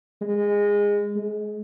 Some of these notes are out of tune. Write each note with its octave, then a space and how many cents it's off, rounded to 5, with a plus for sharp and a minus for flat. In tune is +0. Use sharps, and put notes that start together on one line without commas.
G#3 -20
G#3 +25